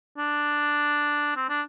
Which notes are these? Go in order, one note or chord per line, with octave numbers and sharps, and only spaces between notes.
D4
C4
D4